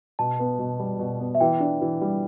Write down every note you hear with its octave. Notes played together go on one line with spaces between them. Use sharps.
B2 A5
B3
B2
G3
B2
B3
E5
E3 G5
D4
E3
G3